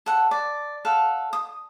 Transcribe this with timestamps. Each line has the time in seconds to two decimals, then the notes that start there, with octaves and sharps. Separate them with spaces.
0.06 A4 F#5
0.31 D5
0.85 A4 F5 F#5
1.33 D#6